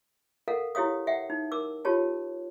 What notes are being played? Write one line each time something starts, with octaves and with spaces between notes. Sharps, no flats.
A4 A#4 F5 F#5
E4 G4 C#5 F5 D#6
E5 F#5 G5
D#4
A#4 D6 E6
F4 G4 C#5 A5